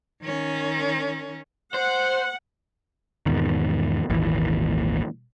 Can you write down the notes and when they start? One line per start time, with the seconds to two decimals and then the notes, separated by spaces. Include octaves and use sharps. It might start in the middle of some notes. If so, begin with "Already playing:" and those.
0.23 D#3 C#4
1.74 C5 F#5
3.26 E2 G#2 B2 D#3
4.10 G#1 D#2 A#2 E3